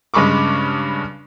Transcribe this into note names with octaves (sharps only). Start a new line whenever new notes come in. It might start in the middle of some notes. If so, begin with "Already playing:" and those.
G2 C#3 G#3 B5 C#6 D6